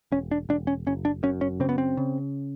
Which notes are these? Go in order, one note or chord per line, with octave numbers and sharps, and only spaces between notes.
E1 C#4
D4
E1 D4
C#4
F#1 C#4
D4
F#2 C#4
C#4
C#3 C4
B3
C4
C#3